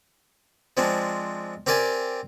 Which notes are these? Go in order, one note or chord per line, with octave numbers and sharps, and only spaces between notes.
F3 G#3 C4 D4
C4 G4 A#4 D5 G#5